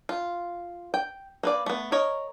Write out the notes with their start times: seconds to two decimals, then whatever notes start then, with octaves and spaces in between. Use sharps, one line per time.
0.09 F4
0.94 G5
1.43 A#3 B4 D5
1.66 A3 B3
1.92 A#4 C#5 D#5